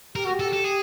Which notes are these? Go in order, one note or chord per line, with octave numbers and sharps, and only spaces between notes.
G4 A#4
F#4
G4
A4
A4
G#4